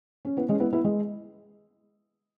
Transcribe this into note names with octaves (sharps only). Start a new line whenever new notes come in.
C#4
B3 E4
G#3 C#4
B3 E4
B3 E4
G#3